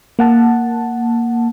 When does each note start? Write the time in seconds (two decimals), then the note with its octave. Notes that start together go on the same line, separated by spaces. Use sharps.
0.19 A#3 F#5 A5